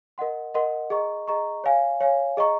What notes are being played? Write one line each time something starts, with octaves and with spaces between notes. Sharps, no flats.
A#4 D#5 F#5 C6
A#4 D#5 F#5 C6
G#4 D#5 A#5 C#6
G#4 D#5 A#5 C#6
C#5 F5 G#5
C#5 F5 G#5
G#4 D#5 A#5 C#6